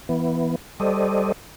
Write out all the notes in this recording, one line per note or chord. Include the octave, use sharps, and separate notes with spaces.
E3 B3
G3 A4 C5 D5 D#5